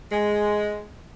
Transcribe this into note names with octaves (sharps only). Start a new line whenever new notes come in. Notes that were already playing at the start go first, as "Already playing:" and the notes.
G#3